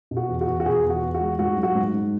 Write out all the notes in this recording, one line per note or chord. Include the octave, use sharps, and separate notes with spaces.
B2
F#4
E2
F#4
E2
F#4
B2 G#4
E2
F#4
E2
F#4
G#3
G#2 F#4
F#3
F#4
G#2
G#2